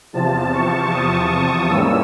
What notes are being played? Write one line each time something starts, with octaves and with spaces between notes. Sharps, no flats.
E2 C3 F3 A5
C#6
D#6
G#2 E3 G3 A#3 C#4 E6